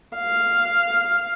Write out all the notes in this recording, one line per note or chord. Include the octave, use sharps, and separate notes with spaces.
F5